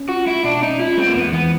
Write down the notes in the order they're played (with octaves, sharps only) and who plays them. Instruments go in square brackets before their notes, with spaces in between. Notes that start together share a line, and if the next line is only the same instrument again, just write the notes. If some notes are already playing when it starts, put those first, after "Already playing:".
Already playing: [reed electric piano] C#4
[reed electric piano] F4 [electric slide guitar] F#4
[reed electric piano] G#3 [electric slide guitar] E4
[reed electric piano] B2 [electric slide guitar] D4
[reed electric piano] C#4 [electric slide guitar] D#4
[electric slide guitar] E4 [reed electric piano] F4
[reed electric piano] G#3 [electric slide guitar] C4
[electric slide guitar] A#3
[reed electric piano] E2 [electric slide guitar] B3
[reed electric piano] E3 [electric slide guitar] B3